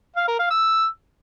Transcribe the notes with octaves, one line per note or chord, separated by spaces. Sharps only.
F5
A#4
F5
E6